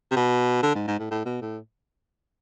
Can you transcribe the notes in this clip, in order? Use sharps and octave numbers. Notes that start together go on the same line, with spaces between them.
C3
B2
D3
G#2
G#2
A2
A2
B2
A2